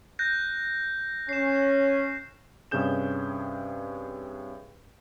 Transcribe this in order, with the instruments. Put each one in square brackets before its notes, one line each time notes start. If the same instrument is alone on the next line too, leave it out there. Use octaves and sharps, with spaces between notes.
[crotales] F#6 G6 A#6
[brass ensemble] C#4 [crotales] C7 E7
[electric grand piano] G2 C3 C#4 G#4 G6 E7